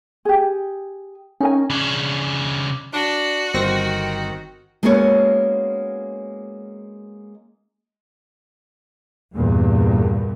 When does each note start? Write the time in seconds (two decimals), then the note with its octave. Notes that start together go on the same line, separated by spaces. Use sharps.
0.25 G4 G#4
1.40 C#4 D#4 A#4 G#5
1.70 C#3 D4
2.94 D4 F#4
3.54 G1 D#3 C4 A#6
4.83 G#3 A#3 B3 C#4 F#4 C#5
9.34 E2 G2 A#2